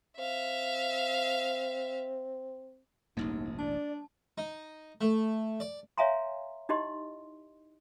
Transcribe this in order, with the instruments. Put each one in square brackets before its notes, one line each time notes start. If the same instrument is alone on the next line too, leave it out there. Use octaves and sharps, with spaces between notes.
[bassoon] C4 [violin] E5 F5
[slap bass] E1 A1 G2 [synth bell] G3 A#3 [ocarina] D#4
[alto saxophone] D4 [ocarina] D5 [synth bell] A5
[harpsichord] D#4
A3
D5
[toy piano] C#5 E5 F5 G#5 A#5 C6
D#4 E4 G4 D#5 C6